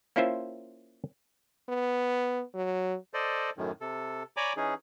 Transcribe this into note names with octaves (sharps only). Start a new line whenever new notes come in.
A#3 C#4 E4 F4 C5 E5
B3
F#3
A4 C5 D5 D#5
F#2 A2 D#3
C3 A4
C#5 D5 G#5 A#5 B5 D6
E3 C#4 D#4 G#4